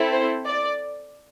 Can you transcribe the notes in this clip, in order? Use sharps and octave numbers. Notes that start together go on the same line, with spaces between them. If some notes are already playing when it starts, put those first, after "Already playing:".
Already playing: C4 E4 A4
C5
D5